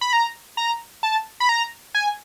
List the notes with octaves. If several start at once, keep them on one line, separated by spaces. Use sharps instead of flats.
B5
A#5
A#5
A5
B5
A#5
G#5